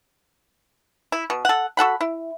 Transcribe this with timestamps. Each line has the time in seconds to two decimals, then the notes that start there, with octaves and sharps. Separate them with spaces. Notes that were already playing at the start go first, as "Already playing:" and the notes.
1.12 E4
1.30 B2
1.45 A4 F#5
1.77 F#4 A4 F#5 B5
2.01 E4